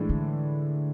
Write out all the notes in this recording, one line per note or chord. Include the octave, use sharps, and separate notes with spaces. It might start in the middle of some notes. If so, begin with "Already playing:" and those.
Already playing: A2 E3 G#3 D4
D3